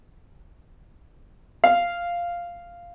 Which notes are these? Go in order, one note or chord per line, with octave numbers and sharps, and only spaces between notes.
F5